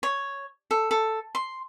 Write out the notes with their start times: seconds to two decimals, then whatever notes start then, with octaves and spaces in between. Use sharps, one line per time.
0.03 C#5
0.71 A4
0.91 A4
1.35 C6